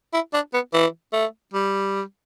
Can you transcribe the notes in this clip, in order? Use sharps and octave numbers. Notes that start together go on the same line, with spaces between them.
E4
D4
B3
E3
A3
G3